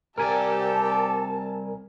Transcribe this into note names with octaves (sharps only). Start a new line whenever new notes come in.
C2 G4 A4 A#4 D5 G#5 A5